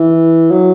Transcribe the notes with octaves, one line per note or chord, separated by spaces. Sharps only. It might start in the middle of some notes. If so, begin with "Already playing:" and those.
Already playing: E3
F#3